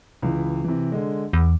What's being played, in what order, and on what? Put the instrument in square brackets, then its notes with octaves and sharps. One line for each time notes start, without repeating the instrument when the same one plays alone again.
[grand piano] C#2 E3
C3 E3
D3 G#3
[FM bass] E2 [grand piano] D6